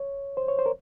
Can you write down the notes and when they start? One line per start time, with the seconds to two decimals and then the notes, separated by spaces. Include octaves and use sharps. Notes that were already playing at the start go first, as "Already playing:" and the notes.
Already playing: C#5
0.37 C5
0.48 C#5
0.59 C5
0.66 A#4